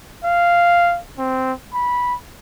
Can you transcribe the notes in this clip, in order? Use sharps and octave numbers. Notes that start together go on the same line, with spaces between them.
F5
C4
B5